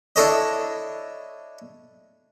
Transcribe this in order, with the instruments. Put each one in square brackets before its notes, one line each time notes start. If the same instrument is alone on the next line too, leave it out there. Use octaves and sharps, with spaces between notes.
[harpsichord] D4 E4 A4 C#5 D#5